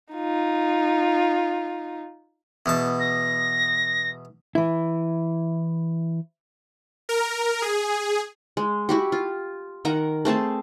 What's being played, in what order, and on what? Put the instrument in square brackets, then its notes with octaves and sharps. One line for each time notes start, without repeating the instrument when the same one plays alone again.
[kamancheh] D#4 F4
[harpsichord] E2 B2 A5
[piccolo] A#6
[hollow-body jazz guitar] E3 E4
[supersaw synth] A#4
G#4
[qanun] G#3
E4 F#4 G4
F4
D#3 A#4 F#5 A#5
A3 C4 G#4 A5